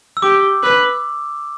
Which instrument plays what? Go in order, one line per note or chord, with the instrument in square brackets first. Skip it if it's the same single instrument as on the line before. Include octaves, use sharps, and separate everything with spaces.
[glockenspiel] E6
[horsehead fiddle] G4 [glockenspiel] D6
[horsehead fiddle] B4